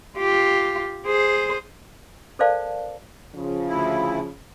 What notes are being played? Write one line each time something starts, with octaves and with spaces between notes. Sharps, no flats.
F4 G4
G#4 C5
A4 A#4 C5 D5 F5 A5
C#3 F3
D2 E4